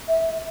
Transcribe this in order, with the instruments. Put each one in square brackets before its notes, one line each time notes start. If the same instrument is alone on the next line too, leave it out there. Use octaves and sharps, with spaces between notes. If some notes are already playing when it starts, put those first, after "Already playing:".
[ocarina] E5